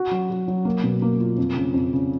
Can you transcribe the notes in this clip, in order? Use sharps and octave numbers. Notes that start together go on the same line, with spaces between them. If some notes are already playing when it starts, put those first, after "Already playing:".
Already playing: F#4
F#3
F#4
F#3
A#3
B2
A#3
F4
F2
C#3
F2
C#3